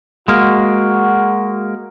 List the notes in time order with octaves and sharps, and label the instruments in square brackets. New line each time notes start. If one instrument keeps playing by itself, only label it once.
[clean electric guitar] G#3 A#3 [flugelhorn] F#4